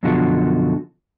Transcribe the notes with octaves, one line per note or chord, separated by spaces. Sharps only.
F#2 B2 D3 F3 F#4